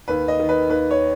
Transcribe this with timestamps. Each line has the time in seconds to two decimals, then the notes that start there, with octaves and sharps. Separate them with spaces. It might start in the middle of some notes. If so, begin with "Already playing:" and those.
0.08 D#2 B4
0.28 D#5
0.40 D#3
0.49 B4
0.69 D#2 B4
0.91 C#5